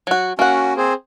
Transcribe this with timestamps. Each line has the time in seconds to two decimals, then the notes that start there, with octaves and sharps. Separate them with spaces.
0.07 F#3 F#4
0.39 A#3 C#4 F#4 F#5
0.77 C4 G#4 C5